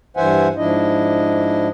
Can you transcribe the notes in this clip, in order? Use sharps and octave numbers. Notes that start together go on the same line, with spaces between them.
G2 E3 C5 E5 F#5 G#5
G#2 F3 D4 E4 D#5